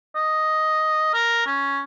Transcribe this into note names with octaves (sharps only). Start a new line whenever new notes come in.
D#5
A#4
C#4